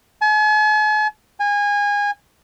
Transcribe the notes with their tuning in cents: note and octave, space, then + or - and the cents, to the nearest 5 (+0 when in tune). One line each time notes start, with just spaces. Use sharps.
G#5 +45
G#5 -25